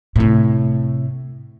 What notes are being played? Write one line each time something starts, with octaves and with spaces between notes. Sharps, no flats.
A2 C3